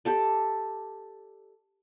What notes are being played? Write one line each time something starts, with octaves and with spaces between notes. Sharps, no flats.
G4 A4 D5